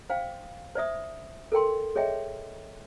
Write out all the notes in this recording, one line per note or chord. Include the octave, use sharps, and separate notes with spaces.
C5 F5 G5
C5 D5 E5 D#6
A4 A#4 G5 C6
G#4 C#5 D#5 E5 G5